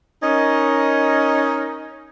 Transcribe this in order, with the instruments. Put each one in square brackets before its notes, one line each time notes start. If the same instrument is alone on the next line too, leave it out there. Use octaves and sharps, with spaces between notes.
[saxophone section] C#4 D#4 A#4 D#5